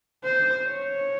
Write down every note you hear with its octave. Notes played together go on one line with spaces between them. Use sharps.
C5
C#5